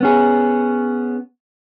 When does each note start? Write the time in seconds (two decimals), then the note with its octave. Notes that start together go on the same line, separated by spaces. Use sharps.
0.01 B3 C#4 G#4